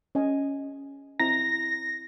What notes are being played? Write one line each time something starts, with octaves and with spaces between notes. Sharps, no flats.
C#4 D#5 G#5
C4 E4 A#5 A#6